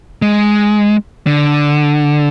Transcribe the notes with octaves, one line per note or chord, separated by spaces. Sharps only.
G#3
D3